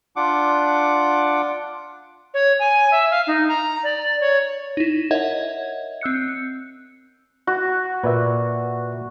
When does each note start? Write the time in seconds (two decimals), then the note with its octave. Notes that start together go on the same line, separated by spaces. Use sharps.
0.16 D4 F4 F#5 D6
2.34 C#5
2.60 G#5
2.92 E5
3.11 F5
3.27 D#4
3.48 A#5
3.83 D5
4.21 C#5
4.77 D#4 E4
5.11 A#4 C#5 D#5 E5 F#5 G#6
6.01 C4 E6 F#6 C#7
7.47 F#4
8.03 A#2 B4 D5 E5